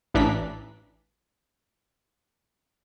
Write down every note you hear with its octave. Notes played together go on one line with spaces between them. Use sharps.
A1 E3 D4 A#5 B6